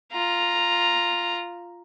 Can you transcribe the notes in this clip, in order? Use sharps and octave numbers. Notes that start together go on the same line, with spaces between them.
F4 A#5